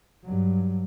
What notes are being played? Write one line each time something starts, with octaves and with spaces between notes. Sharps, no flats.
G2 F#3